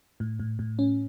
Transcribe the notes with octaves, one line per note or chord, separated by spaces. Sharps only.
A2
A2
A2
C#4